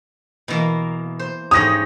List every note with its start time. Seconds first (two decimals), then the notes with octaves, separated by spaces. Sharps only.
0.48 B2 E3 A#3
1.19 C5
1.51 G#2 G4 C#5 D#6 A#6